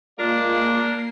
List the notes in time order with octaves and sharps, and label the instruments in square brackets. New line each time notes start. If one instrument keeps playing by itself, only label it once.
[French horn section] G#3 F4 [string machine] A#3 C7 [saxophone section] D4 A#4 D5